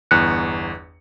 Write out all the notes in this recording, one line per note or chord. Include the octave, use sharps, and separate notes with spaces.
G1 E2 F#6 C#7